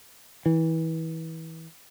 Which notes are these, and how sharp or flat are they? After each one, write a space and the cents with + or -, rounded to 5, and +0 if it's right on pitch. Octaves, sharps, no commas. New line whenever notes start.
E3 -30